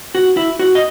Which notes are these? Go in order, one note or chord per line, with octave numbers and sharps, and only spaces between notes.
F#4
E4
F#4
D#5